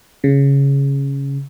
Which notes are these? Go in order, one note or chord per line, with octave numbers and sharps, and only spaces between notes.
C#3